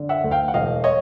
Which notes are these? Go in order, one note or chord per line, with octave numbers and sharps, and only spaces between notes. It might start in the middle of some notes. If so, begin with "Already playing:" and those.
Already playing: D3
E5 F#5
D2
F5 G5
F#5
E1 D#5 F5
C#5 D#5